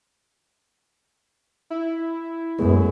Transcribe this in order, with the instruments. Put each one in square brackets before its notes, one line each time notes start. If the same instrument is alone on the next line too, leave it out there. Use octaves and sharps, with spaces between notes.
[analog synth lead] E4
[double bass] F#2 [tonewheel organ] G#3 A3 B3